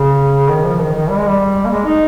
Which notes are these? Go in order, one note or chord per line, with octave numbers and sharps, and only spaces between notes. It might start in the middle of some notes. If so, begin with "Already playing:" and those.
Already playing: C#3
D#3
F3
D#3
D#3
G3
G#3
G3
A#3
G#3
D#4